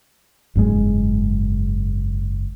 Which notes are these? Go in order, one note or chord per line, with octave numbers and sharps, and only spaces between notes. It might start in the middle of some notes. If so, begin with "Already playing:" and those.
F#1 G#2 B2 G#3